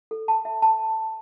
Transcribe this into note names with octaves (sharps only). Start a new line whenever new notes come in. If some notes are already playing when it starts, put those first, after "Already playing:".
A4
A5
E5
A5